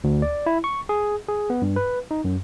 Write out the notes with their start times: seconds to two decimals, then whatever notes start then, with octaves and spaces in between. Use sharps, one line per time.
0.04 D2
0.22 D5
0.46 E4
0.64 C#6
0.89 G#4
1.28 G#4
1.50 B3
1.62 G2
1.76 B4
2.11 D#4
2.25 F#2